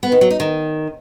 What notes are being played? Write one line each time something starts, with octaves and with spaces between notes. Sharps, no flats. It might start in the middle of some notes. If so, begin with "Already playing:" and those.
B3
D#3
F#3
D#4
D#3